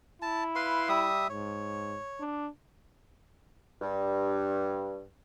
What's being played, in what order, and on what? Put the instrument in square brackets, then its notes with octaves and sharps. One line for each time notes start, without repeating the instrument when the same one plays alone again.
[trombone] E4 [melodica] A5
[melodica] B4 F5 C6
G3 E5 D#6
[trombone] G#2 [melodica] C#5
[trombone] D4
[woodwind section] G2